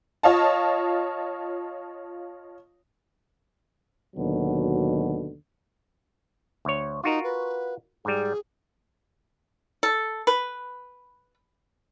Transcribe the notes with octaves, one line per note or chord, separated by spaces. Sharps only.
F4 C#5 D#5 F5 A5
D#2 B2 D3 F#3
D2 C#5
D#4 F4 F#4 A#4
B4
G#2 G3 G#4
A4
B4